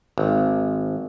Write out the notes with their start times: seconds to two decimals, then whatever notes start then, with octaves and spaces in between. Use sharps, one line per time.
0.18 G#1